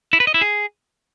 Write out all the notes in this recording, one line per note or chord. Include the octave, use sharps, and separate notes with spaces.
E4
B4
D#5
E4
G#4